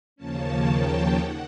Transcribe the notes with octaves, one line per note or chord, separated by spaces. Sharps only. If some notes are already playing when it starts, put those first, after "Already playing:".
D#2 C#3 F3 A#3 C#4 A5
G5
D#3 F#5